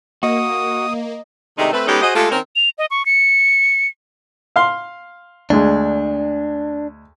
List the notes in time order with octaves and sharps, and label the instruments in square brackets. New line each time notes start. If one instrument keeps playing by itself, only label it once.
[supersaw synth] A#3 [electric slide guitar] F#4 [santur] D#5 [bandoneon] D#6
[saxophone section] C3 D#3 G#3 A3 D4 D#4
A3 C4 A4 B4
G#3 B3 C#4 D#4 G4 A4
F#4 G#4 C5 D#5
G#3 A3 F4 G4 A4
D#3 C4 C#4 A#4
[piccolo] F7
D#5
C#6
C#7
[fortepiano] F5 C6
[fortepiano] D2 G#3 [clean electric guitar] D4